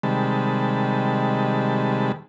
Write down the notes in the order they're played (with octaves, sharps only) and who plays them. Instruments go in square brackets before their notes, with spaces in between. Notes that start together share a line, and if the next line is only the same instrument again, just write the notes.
[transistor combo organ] C3 D#3 G3 G#3 A5 B5